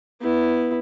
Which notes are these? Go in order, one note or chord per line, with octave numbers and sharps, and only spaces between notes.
B3 E4